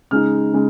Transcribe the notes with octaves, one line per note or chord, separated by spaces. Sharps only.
C#3 G#3 D#4 F6
C#3 G#3